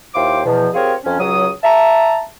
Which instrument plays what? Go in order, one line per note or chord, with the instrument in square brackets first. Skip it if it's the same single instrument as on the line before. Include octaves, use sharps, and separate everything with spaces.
[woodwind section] D#2 E4 F4 C5 G5 D6
E2 B2 F3
C4 F4 G4 G#4 A#4 C#5
F2 C#4
C#2 F#3 D#6
E5 A5 A#5